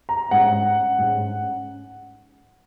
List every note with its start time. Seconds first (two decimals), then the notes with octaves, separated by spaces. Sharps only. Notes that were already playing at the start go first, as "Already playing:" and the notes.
0.09 A#5
0.31 G#2 G#3 C#4 F#5
0.98 G#2 G#3 C#4